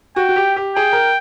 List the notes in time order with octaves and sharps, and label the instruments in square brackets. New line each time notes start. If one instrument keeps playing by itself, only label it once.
[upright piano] F#4 [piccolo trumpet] G5
[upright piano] F#4
G4
G4
[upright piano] G#4 [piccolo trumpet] G5
[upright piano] A#4